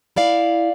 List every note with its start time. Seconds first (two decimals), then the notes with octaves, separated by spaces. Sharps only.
0.16 E4 D5 F5